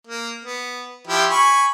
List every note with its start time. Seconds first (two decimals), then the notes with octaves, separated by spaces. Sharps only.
0.07 A#3
0.45 B3
1.07 F3 E4 G4
1.30 G#5 B5 C#6